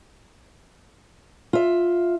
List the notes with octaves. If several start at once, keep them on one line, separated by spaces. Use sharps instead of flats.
F4 E5